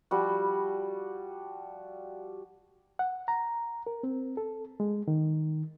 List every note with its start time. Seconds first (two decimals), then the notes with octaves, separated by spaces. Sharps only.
0.11 F3 G3 F#4
2.99 F#5
3.28 A#5
3.87 A#4
4.03 C4
4.37 A4
4.80 G#3
5.08 D#3